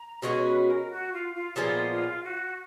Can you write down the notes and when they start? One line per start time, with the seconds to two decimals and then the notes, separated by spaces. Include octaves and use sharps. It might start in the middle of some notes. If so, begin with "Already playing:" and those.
Already playing: A#5
0.22 B2 G#3 C#4 F#4 C#5
0.45 B4
0.67 A#4
0.90 F#4
1.13 F4
1.35 F4
1.56 A#2 F3 G#3 B3 F4
1.90 F4
2.23 F#4